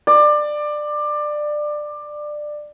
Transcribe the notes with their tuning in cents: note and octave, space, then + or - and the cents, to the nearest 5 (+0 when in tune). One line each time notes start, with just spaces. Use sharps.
D5 +20